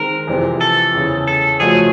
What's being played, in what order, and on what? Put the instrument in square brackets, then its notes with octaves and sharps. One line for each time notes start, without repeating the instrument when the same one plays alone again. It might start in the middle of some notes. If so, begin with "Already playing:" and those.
Already playing: [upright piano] D#3 G#3 C4 [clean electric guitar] A#4
[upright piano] F2 C3 E3 G#3 C4
[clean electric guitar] A4
[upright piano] E2 C#3 E3 G#3
[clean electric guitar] A4
[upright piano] C#3 F3 A3 C#4 F#4 [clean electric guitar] G#4